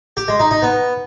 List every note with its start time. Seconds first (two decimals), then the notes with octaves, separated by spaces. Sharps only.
0.17 G4
0.28 G#3
0.40 D#4
0.51 D#4
0.62 B3